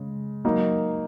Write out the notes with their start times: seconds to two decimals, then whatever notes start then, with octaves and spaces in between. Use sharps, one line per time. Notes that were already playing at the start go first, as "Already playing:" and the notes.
Already playing: C#3 G#3
0.45 F#3 A#3 D#4